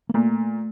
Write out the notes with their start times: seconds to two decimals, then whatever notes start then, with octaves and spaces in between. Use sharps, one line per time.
0.09 A#3
0.14 A#2 A3